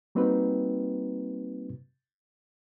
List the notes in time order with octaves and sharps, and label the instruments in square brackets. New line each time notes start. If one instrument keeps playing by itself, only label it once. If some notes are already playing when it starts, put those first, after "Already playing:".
[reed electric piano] G3 A#3 C4 D#4 F#4 B4